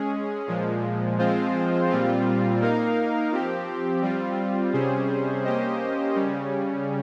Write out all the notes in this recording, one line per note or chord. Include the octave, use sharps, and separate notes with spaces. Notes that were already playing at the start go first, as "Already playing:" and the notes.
Already playing: G#3 C#4 G#4
A#2 F3 G#3
F3 G#3 C4 F4 C5
A#2 G3 C4 F4
A#3 D#4 A#4 F5
F3 C4 G4
G3 C4 F4
C3 G3 C#4 G#4 C5
A#3 C#4 G4 C5 D#5
C#3 G3 C#4